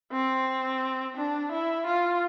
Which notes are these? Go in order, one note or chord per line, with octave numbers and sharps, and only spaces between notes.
C4
D4
E4
F4